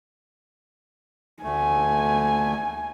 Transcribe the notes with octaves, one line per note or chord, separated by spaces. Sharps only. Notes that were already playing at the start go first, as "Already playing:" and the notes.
D2 A3 G#5